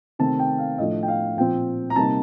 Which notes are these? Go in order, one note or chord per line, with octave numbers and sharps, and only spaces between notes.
C3 D#3 A3 C4 A5
G5
F5
A2 F3 A3 D4 D#5
G5
F5
A#2 F3 C4 G5
A#5
C3 G3 A#3 D#4 A5